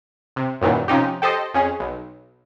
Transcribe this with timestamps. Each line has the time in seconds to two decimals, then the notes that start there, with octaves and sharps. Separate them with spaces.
0.36 C3
0.61 F#2 A#2 D#3 E3 F#3 G3
0.88 C3 F3 C#4 D#4 G4
1.22 G4 A4 C5 D#5
1.54 F2 C#4 G#4
1.80 B1